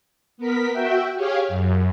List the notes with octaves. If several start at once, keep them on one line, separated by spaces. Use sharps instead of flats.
B3 A#4 B6
F#4 E5 G5
G4 G#4 C#5 F5
F#2